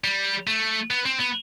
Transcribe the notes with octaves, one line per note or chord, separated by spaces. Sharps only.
G3
A3
B3
C4
B3